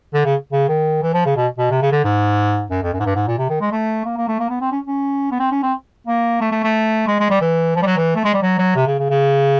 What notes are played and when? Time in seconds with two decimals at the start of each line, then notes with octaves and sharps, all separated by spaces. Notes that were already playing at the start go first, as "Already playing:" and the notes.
0.14 D3
0.25 C#3
0.53 C#3
0.69 D#3
1.02 E3
1.14 F3
1.26 C#3
1.37 B2
1.58 B2
1.71 C3
1.82 C#3
1.92 D3
2.04 G#2
2.71 F#2
2.83 F2
2.93 F#2
3.00 G#2
3.05 G2
3.15 G#2
3.28 A#2
3.38 C3
3.50 D#3
3.61 G#3
3.72 A3
4.05 A#3
4.17 A#3
4.28 A3
4.40 A#3
4.50 B3
4.61 C4
4.72 C#4
4.87 C#4
5.31 B3
5.40 C4
5.52 C#4
5.63 C4
6.07 A#3
6.41 A3
6.52 A3
6.64 A3
7.07 G#3
7.20 G#3
7.31 G3
7.41 E3
7.76 F3
7.82 G3
7.86 F#3
7.97 E3
8.16 A3
8.24 G#3
8.34 G3
8.42 F#3
8.59 F#3
8.76 C3
8.87 C#3
8.99 C#3
9.10 C#3